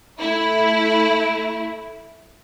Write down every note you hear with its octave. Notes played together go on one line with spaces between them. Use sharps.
A3 E4